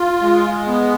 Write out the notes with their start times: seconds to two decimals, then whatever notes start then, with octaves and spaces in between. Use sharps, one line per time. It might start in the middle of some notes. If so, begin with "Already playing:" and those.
Already playing: F4
0.22 G#3
0.67 B3